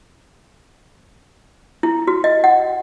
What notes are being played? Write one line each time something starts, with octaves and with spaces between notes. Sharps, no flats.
E4
F#4
D#5
F#5